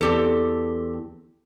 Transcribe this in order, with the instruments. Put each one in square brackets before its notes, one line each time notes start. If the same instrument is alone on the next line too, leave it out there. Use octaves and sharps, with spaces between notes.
[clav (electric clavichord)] E2 D5 [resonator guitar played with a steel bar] C4 G4 A4